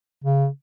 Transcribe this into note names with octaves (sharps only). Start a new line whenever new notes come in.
C#3